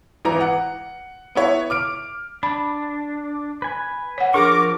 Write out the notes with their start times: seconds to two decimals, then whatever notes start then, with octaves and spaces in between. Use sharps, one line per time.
0.25 G#1 E3 A#5
0.40 F#5
1.35 B3 E4 C#5
1.70 D6 F6 D7
2.43 D4 B5
3.62 B4 G#5
4.18 C#5 F#5
4.34 F3 D4 G#4 A#4 C#6 D6